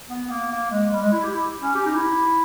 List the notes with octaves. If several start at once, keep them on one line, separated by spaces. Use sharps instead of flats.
B3
A#3
A#3
G#3
G3
G#3
E4
G4
E4
C#4
G4
D#4
E4